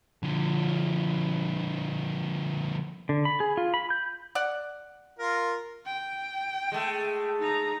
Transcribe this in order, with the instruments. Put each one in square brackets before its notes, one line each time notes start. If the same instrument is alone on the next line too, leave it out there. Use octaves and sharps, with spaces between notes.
[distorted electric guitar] D3 F3
[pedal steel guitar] D3
B5
G#4
F4
B5
G6
[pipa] D5 F#5
[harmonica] F4 A#4
[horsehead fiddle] G5
[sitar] G#3 A3
[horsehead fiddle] D#4 A#5